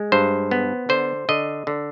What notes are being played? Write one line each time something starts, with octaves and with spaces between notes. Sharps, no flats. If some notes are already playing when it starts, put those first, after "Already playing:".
Already playing: G#3
G2 C5
B3
D3 C5
D3 D#5
D3